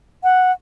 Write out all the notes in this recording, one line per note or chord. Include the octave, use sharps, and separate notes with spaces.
F#5